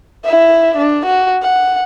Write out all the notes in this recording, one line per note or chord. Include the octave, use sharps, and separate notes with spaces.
E4 E5
D4
F#4
F#5